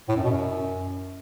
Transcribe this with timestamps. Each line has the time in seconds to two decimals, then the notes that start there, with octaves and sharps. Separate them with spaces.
0.09 A2
0.16 F#2
0.23 B2
0.31 F#2